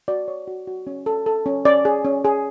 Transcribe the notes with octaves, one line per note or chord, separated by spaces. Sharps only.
F#4 D5
C#5
F#4
F#4
C#4
A4
A4
C#4
C#4 D5
G#4
C#4
G#4